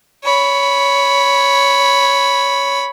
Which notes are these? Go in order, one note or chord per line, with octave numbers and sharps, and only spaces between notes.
C#5 B5